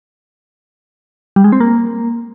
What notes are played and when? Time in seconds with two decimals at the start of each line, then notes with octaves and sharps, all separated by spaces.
1.36 G3
1.44 G#3
1.52 C4
1.60 A#3